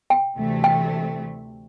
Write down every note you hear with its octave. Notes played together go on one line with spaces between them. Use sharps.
G5
D2 C3 E3 A3
G5